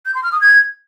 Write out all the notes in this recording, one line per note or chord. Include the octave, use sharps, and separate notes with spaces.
G6
C6
F6
D#6
G#6